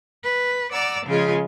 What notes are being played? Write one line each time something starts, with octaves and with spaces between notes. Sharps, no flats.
B4
D5 F#5 A#5 D6 E6
C#3 F3 G#3 F4 G#4